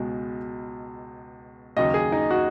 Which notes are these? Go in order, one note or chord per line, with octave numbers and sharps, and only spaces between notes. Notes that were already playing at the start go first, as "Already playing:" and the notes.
Already playing: C#2 B2 G#3
D#2 C#3 F#3 D#5
G#4
D#4
F#4